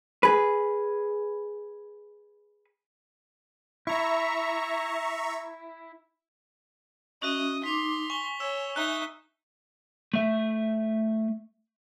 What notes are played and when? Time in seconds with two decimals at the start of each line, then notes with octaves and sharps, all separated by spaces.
0.23 G#4 B4
3.87 E4 E5 A#5 C#6
7.22 C#4 F#4 D#5 E5
7.63 D#4 C6 D6 B6 F7
8.10 G#5 C#6 G7
8.40 C#5 E6 E7
8.76 D#4 E5 F#6 G7
10.14 A3 E5